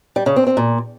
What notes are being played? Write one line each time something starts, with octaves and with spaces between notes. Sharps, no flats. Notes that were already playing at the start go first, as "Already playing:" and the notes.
G3
C#3
C4
C4
A#2